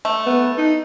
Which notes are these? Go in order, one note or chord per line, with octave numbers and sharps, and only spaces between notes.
A3
B3
D#4